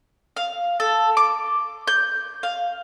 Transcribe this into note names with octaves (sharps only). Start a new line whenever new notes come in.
F5
A4
D6
G6
F5